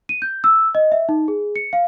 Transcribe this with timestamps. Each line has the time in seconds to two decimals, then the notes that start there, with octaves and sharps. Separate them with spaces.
0.09 D#7
0.22 G6
0.44 E6
0.75 D#5
0.92 E5
1.09 D#4
1.28 G#4
1.56 C#7
1.73 F5